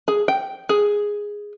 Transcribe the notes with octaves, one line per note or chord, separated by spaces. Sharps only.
G#4
G5
G#4